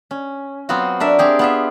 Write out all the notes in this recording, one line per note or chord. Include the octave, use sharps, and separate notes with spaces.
C#4
F#3 B3 C4 F4 F#4
D4 A#4 E5
C4 G4 G#4
B3 F4 E5